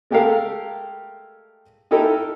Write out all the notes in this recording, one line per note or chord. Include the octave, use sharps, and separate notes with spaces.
G#3 A3 G4 A4 A#4 F5
D#4 E4 G4 A4 A#4